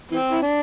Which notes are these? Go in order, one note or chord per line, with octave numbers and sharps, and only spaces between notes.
E3 C4
E4
D4